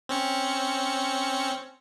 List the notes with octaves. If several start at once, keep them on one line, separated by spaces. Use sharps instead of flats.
C4 C#4 C#7